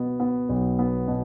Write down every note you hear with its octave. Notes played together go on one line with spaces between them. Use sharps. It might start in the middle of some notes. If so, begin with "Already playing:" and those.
Already playing: B2 B3
B3
B1
B3
B2